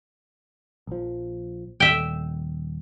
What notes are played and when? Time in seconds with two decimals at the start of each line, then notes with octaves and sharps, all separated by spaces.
0.87 A#1 F3
1.80 D#1 E5 G5